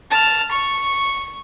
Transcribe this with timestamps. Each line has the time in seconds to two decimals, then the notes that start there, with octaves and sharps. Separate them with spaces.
0.11 A5 F6
0.52 C#6